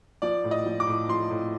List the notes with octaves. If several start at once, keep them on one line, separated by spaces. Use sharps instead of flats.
F3 D5
A2
D#5
F3
D6
A2
F3 C6
A2